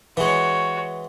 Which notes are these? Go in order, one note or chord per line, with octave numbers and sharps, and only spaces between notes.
E3 G#3 F#4 C#5